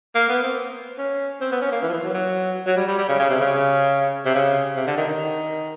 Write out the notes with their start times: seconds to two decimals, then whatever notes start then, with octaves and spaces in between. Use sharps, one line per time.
0.15 A#3
0.29 B3
0.43 C4
0.98 C#4
1.41 C4
1.51 B3
1.62 C#4
1.72 A#3
1.83 E3
1.89 F3
1.93 E3
2.03 F#3
2.14 F#3
2.67 F#3
2.77 G3
2.87 G3
2.98 G3
3.09 C#3
3.19 C#3
3.30 C3
3.40 C#3
4.26 C3
4.35 C#3
4.76 C3
4.87 D3
4.97 D#3
5.08 D#3